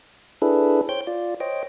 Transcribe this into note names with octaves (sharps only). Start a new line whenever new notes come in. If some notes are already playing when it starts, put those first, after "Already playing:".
D4 E4 G#4 A4 B4
C5 C#5 G5 G6
F4 D5
C5 C#5 D#5 G5